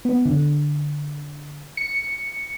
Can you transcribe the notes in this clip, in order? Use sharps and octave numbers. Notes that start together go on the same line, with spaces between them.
B3
D3
C#7